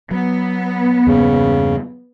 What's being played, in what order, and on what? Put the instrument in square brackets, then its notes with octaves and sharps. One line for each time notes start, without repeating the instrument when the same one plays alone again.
[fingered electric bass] F#3 [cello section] B3
[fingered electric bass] E2 G2 A#3 [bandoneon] C#3